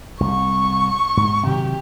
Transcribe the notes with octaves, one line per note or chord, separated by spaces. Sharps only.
C2 C#6
G#2
C3 D#3 F#3 G4